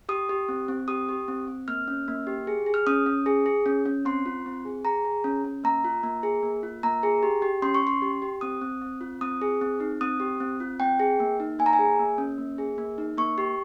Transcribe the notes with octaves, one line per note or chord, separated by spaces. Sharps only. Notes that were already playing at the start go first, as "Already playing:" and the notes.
G4 D#6
G4
C4
C4
G4 D#6
G4
C4
C4
A#3 F6
C#4
A#3
G4
G#4
G#4
F6
C#4 D#6
C#4
G#4
G#4
C#4
C#4
C4 C6
F4
C4
G#4
G#4 A#5
G#4
C#4
C#4
A#3 A#5
F4
A#3
G#4
A#3
F4
A#3 A#5
G#4
G4
G4
C#4 C6
C#6
C#4 C6
G4
G4
C4 D#6
C4
C4
F4
C4 D#6
G#4
C4
D#4
C4 D#6
G4
C4
F4
C4 G5
G#4
A#3
D#4
A#3 G#5
A#5
G#5
G#4
A#3
C#4
A#3
G#4
A#3
D#4
A#3 C#6
G4